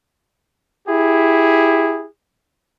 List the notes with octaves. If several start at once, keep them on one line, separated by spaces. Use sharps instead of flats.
E4 G4 G#4